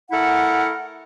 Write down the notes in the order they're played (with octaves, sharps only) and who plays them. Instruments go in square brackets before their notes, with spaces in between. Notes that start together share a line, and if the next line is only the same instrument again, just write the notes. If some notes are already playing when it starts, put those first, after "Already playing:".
[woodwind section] A3 E4 A4 A#4 F#5